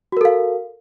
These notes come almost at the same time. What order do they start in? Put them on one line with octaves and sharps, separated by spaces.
F#4 A#4 A4 F5